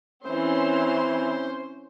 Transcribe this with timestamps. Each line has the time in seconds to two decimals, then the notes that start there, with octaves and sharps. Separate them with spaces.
0.25 E3 C4 C#4 C5 C6